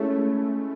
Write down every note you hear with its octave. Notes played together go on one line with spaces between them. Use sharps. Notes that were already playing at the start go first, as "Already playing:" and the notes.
Already playing: G#3 A3 C#4 E4